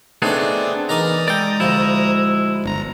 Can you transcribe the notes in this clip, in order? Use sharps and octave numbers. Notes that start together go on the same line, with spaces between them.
A3 B3 C4 D4 D#4 G#4 A4 D5
E3 D#4 A#4 D5 A#5 D#6
G#3 A4 D5 G5
D2 F3 E4
G1 A#5